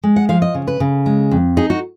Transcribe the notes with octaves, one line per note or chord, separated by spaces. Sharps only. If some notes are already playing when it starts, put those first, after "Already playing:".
G#3
F#5
F3 F5
D#5
C#3
B4
C#3
G#3
F2
D#4 G#4
F#4